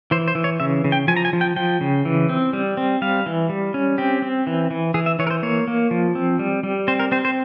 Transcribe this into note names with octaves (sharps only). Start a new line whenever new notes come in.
E3 C5
C5
E3
C#5
C#3 E5
C#3
G5
F3 G#5
A#5
G#5
F3
G5
F3 G5
C#3
E3
C4
G3
C4
G3 F5
E3
G3
C#4
C4 G4
C4
E3
E3
E3 G#4
E5
E3 C#5
A#4
C5
A#3 C#5
A#3
F3
C4
G3
G3
C4 C5
A#4
C4 C5
C5